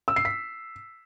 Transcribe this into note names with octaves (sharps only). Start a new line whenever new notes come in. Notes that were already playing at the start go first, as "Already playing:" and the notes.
E6
C7
B6